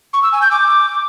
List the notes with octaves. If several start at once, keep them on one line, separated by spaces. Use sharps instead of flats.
C#6
E6
G#5
G6
D6